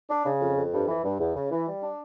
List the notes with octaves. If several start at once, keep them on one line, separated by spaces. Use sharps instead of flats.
D4
C#3
F2
F2
G2
E3
G2
E2
C#3
E3
G3
D4